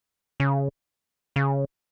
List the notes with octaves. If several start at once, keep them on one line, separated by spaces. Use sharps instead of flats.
C#3
C#3